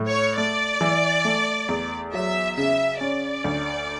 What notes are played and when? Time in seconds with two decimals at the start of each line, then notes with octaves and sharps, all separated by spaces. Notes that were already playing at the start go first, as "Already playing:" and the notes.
Already playing: A2
0.08 C#5
0.37 A3 D5
0.81 E3
1.25 A3
1.69 E2
2.13 F#3 E5
2.57 C#3 E5
3.01 C#4 D5
3.44 D2